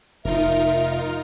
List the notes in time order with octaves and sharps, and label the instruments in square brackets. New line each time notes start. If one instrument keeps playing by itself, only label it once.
[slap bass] F1 F3 [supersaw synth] D#4 F4 A#4 [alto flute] E5